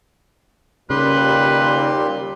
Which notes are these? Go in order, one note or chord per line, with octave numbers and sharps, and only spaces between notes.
D#2 A#2 C#3 G3 G4 B4 C6